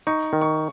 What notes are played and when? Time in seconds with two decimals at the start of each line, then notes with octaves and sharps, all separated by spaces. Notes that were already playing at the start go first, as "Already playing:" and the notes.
0.07 D#4 C#6
0.33 D#3
0.41 C#6